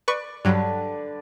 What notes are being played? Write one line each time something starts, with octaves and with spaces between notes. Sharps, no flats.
B4 D5 C#6
G2 D3 F#3 B4